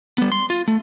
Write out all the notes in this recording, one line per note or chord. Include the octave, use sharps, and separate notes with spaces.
G3 B3
C6
F4
A3